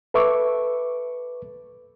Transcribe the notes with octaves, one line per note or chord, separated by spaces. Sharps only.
A4 B4 E5 C#6 D6